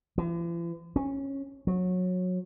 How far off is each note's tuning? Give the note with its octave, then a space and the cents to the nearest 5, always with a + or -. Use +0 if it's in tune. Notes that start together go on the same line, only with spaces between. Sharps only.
E3 +45
C#4 -15
F#3 -20